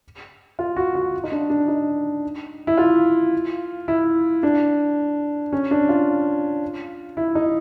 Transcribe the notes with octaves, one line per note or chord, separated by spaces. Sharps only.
F4
F#4
F#4
D#4
D4
D4
D#4
E4
F4
E4
D4
C#4
D4
F4
E4
D#4